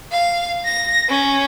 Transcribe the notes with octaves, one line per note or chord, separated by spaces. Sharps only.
F5
A#6
C#4